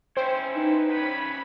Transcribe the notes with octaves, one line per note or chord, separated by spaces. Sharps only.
C#4 E4 C5 G5
D#4 B4
C#4 B4 B5